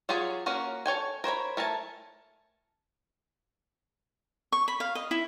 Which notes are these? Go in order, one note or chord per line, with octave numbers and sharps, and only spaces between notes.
F#3 F4 G4 G#4 C#5
A#3 C#4 F#4 A#4
A4 C#5 G5 G#5
A#4 C5 C#5 B5
A3 A#4 G#5 A5
C#6
B5
F5
D#5
E4